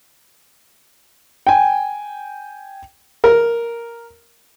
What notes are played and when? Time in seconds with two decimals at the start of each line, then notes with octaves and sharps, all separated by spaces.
1.47 G5 G#5
3.24 A#4